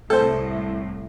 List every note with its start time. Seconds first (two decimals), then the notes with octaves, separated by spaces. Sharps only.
0.10 C2 A2 A4 C5